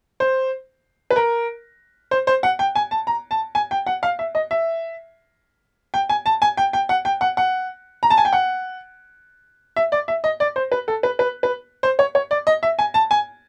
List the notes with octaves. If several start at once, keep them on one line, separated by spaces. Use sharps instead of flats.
C5
B4
A#4
C5
C5
F#5
G5
G#5
A5
A#5
A5
G#5
G5
F#5
F5
E5
D#5
E5
G5
G#5
A5
G#5
G5
G5
F#5
G5
F#5
F#5
A#5
A5
G#5
G5
F#5
E5
D5
E5
D#5
D5
C5
B4
A4
B4
B4
B4
C5
C#5
C#5
D5
D#5
E5
G#5
A5
G#5